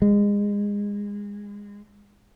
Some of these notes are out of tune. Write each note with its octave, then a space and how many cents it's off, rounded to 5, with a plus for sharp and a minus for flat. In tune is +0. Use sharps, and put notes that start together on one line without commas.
G#3 -25